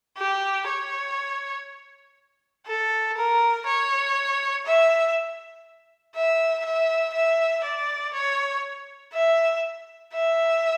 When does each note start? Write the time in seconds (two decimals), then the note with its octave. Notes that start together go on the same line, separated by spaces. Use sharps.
0.18 G4
0.68 C#5
2.67 A4
3.17 A#4
3.66 C#5
4.66 E5
6.15 E5
6.65 E5
7.14 E5
7.64 D5
8.14 C#5
9.14 E5
10.13 E5